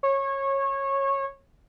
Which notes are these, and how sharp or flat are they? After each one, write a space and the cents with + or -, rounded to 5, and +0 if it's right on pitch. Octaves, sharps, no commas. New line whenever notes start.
C#5 -20